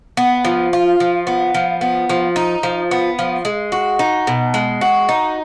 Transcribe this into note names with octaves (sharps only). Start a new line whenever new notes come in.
B3
F3
F4
F3
B3
F3
B3
F3
D#4
F3
B3
F3
G#3
F#4
D#4
B2
G#3
F#4
D#4